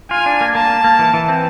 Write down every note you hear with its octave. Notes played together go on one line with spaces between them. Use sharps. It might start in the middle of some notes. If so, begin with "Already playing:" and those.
F4 G#5
D4
A#3
A#3 A5
A#3
A#3
E3
E3
C4